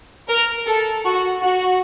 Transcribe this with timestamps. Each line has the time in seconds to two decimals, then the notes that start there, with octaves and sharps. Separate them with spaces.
0.28 A#4
0.66 A4
1.05 F#4
1.42 F#4